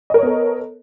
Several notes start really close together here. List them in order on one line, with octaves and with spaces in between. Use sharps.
D#5 A#4 C#5 B3 A4